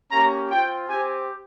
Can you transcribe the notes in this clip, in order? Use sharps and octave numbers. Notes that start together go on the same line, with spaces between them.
A#3 C#4 G4 A#5
C4 F4 G5
C4 G4 G#5